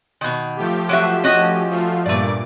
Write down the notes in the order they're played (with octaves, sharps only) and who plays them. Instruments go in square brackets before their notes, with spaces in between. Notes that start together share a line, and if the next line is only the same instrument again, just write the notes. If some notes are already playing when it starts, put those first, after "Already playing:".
[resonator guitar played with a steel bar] B2 D#3
[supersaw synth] F3 A3 G4
[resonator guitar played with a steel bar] F#3 F#4 E5
C#4 F#4 D#5
[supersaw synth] F3 A3 F4
[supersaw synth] G2 A#2 D6 [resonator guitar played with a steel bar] A3 D5